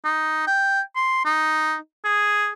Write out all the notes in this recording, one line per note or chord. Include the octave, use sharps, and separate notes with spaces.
D#4
G5
C6
D#4
G#4